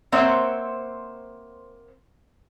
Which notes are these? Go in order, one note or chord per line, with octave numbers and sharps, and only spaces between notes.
A#3 C4 C5 C#5 E5 F#5